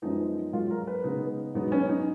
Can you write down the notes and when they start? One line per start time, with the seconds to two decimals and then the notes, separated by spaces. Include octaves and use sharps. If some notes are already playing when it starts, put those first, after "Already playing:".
0.02 F#2 F3 G#3 B3 D#4
0.53 G#2 F#3 A#3 F4
0.71 A#4
0.87 B4
1.04 C#3 G#3 B3 D#4
1.54 G#2 F#3 B3 D#4
1.72 C#4
1.89 D#4